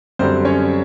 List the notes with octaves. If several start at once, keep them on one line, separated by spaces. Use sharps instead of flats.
F#2 D3 G3 C4 C5
C#4 C#5